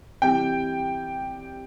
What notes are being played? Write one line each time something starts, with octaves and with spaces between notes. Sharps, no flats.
C3 E3 G3 G5